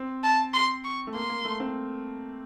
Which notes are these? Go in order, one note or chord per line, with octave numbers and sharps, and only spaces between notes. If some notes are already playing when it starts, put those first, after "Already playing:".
Already playing: C4
A5
C6
C#6
A3
A#3 C6
A#3
A3
C4